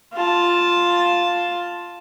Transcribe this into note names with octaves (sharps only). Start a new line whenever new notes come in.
F4 A5